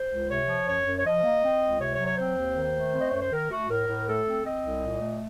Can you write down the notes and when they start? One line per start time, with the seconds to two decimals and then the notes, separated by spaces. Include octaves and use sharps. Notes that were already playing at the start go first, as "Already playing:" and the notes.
Already playing: C5
0.10 C#2
0.30 C3 C#5
0.48 F3
0.67 F#2 C#5
0.86 F#2
0.98 C#5
1.05 F3 D#5
1.23 A#3
1.42 C4
1.62 C#2
1.80 C3 C#5
1.93 C#5
1.99 F#3
2.06 C#5
2.18 C4 C5
2.37 D#2
2.55 D#3
2.74 A3
2.93 C4
3.00 D#5
3.10 F#2 C#5
3.21 C5
3.31 D#3 A#4
3.50 A3 F#4
3.69 A2 A#4
3.87 A2
4.06 A3 A4
4.26 C4
4.44 C4 D#5
4.63 C2
4.82 A#2
5.01 A3